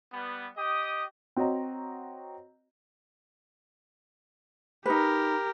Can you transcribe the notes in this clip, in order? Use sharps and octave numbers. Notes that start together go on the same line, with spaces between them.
G3 B3
G4 D#5 D#6
C4 F#4 C#5 D#5 A#5
D#4 G4 A#4 B4